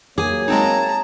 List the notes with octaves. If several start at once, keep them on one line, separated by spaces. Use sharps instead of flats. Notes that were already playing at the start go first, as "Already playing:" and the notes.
F#3 A#3 G#4 C#5 G#5 D6
G#3 C4 D#4 A5 A#5